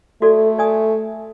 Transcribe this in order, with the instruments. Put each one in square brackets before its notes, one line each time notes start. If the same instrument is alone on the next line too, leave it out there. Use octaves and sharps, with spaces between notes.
[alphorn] A3 [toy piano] F#4 A4 D5
[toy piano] D5 G#5 D#6